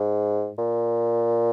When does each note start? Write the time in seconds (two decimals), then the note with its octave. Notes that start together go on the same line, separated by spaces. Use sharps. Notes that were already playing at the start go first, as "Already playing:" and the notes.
Already playing: G#2
0.58 A#2